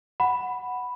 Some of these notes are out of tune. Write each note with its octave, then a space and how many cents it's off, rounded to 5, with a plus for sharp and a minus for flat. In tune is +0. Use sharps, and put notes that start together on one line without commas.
F#5 +0 B5 +0